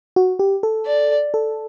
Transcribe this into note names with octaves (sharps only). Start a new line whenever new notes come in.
F#4
G4
A4
D5
A4